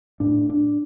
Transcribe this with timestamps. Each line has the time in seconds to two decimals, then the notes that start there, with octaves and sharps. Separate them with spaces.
0.20 A2 D4
0.50 D4